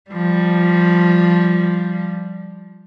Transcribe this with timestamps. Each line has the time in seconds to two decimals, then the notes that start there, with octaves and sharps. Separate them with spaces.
0.11 F3 G3